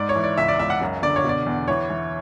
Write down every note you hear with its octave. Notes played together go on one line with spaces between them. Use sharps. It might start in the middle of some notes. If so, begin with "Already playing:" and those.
Already playing: G#2 D5
C#5
E3
D5
C#2 E5
D5
C#2 E5
F#5
F#2
D3 D5
C#5
B2 D5
E2
E3 C#5
E3